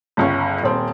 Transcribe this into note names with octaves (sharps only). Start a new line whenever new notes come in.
G1 C#2 C#4
D#1 C4